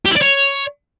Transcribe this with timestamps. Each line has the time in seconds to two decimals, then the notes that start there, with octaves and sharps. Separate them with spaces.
0.06 G4
0.11 E4
0.17 D5
0.22 C#5